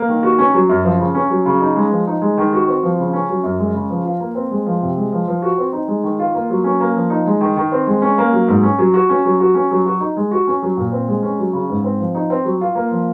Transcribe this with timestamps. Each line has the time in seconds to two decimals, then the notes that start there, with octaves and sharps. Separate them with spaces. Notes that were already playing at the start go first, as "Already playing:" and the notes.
Already playing: A#3
0.08 D#3
0.23 F#4
0.39 C#4
0.54 F#3
0.69 F#2
0.84 F3
0.99 C#3
1.15 C#4
1.30 F#3
1.46 C#3
1.61 D#4
1.76 G#3
1.91 F3
2.07 D#4
2.22 G#3
2.38 D#3
2.53 F#4
2.68 C4
2.83 F3
2.99 C#3
3.13 C#4
3.29 F#3
3.44 F#2
3.59 G#3
3.74 C#3
3.90 F3
4.05 F4
4.20 A#3
4.35 C4
4.51 G#3
4.66 F3
4.82 C3
4.97 G#3
5.12 F3
5.28 F3
5.42 F#4
5.58 C4
5.73 D#4
5.88 G#3
6.04 D#3
6.19 F4
6.34 A#3
6.50 F#3
6.64 C#4
6.80 A#3
6.96 F3
7.10 D#4
7.26 G#3
7.41 D#3
7.57 D#3
7.72 C4
7.87 G#3
8.02 C#4
8.18 A#3
8.32 F#3
8.48 G#2
8.63 C#4
8.78 F#3
8.94 F#4
9.09 C#4
9.25 F#3
9.40 F#4
9.54 C#4
9.71 F#3
9.86 F#4
10.00 D#4
10.17 G#3
10.31 F#4
10.47 C#4
10.62 F#3
10.77 A#2
10.92 C4
11.08 G#3
11.23 C#4
11.39 F#3
11.53 C#3
11.69 G#2
11.84 C4
12.00 F3
12.15 D#4
12.30 C4
12.45 F#3
12.61 F4
12.75 A#3
12.91 F3